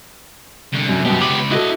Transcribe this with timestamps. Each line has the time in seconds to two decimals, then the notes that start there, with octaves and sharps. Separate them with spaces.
0.73 C2 D3
0.89 F#2
1.06 F#2 B2 B3 G4
1.21 C#2 B5 D6
1.51 E4 F#4 A4 D#5